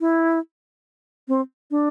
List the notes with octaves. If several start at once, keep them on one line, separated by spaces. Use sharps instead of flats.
E4
C4
D4